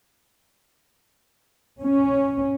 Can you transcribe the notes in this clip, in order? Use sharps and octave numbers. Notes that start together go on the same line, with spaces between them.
C#4